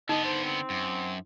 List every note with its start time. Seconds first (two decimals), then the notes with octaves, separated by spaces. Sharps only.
0.09 D3 B3 D#4 D#5
0.24 C5
0.44 C4
0.70 F#2